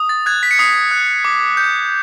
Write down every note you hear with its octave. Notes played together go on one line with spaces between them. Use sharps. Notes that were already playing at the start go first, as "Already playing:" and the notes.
Already playing: D#6
A6
F#6 G#6
B6
C#7
D#6 C7
F#6
D6
G6